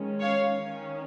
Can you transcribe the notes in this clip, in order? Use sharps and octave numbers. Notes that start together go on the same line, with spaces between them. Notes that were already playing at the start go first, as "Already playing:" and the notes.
Already playing: D#3 G#3 C#4
C#5 F5
D#3 C#4